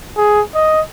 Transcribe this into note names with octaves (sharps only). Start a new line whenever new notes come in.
G#4
D#5